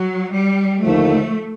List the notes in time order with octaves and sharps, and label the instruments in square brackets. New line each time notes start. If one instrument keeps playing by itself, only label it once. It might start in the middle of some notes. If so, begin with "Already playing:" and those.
Already playing: [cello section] F#3
G3
[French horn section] D#2 D3 F3 A#3 D#4 [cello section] A3